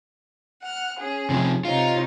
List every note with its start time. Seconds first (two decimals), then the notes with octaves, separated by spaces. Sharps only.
0.62 F#5 F6
0.98 C#4 G#4
1.30 C3 E3 F3
1.65 C3 D#4 F4 C#5